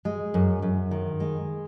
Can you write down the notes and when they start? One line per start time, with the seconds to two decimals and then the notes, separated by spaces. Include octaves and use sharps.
0.05 G#3
0.34 F#2
0.62 F#2
0.91 D#3
1.20 G#3